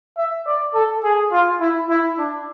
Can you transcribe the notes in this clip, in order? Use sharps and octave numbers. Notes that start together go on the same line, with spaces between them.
E5
D5
A4
G#4
F4
E4
E4
D4